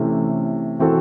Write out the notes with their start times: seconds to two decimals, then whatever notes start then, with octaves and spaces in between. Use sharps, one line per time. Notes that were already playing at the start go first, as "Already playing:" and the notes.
Already playing: C3 E3 A3 C#4
0.80 E3 C4 F#4 A4